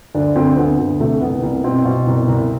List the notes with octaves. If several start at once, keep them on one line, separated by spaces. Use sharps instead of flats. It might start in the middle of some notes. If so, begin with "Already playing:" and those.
D2 D4
D2 C4
D2 B3
D2
C3 A3
C2 B3
C2
B2 C4
B2
C2
C2